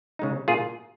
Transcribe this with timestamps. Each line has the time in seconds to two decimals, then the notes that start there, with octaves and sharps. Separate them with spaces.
0.19 C#3 G#3 D#4
0.48 A#2 F4 G#4